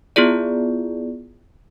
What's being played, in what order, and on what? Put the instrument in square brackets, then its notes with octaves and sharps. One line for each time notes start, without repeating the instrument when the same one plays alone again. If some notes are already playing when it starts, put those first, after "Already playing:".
[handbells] B3 E4 F4 G#4 D5